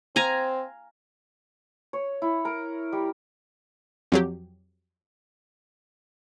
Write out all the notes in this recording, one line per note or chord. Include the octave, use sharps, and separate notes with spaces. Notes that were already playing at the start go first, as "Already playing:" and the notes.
C4 F5 G#5 A#5
C#5
E4
A#4
G3
F2 F#3 G4